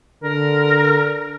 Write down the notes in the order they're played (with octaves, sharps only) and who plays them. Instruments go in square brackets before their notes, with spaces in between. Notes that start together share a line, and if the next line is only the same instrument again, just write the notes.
[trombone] D3 [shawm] A#4